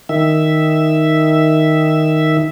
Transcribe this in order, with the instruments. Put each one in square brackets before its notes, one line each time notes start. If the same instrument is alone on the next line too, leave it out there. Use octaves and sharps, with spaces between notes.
[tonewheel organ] D#3 E5